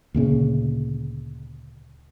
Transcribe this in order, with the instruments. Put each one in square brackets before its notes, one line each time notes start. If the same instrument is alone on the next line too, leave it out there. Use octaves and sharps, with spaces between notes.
[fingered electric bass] D2 A#2 C#3